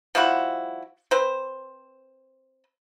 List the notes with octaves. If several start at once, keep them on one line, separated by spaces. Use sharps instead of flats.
F3 G3 E4 F#4
C4 B4 C5